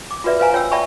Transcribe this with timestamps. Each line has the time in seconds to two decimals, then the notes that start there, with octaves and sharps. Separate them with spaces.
0.11 D6
0.24 F4 F#4 B4 D5 E5
0.39 B4 C5 F5 G#5 A#5
0.53 F4 C#5 G5 E6
0.71 D5 E5 G5 A5 B5 C#6